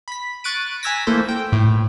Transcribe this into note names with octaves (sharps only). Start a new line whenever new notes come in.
B5 B6
C#6 F#6 A6 D7 D#7
G#5 A#5 E6 G#6 A#6 B6
E3 A3 A#3 A4 C5
G5
A2